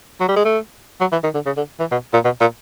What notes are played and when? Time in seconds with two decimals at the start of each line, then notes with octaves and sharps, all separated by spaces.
0.21 F#3
0.29 G3
0.37 G#3
0.45 A3
1.01 F#3
1.12 E3
1.24 D#3
1.35 D3
1.46 C#3
1.57 D3
1.80 E3
1.92 B2
2.13 A#2
2.25 B2
2.41 A#2